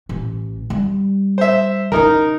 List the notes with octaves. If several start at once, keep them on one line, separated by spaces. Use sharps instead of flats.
A1 E3
G3
C5 E5
C#3 D#4 E4 A#4